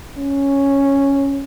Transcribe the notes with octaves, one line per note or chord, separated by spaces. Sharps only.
C#4